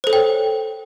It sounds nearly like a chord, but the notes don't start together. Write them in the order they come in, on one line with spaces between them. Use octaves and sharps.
C5 A4 C#5 G5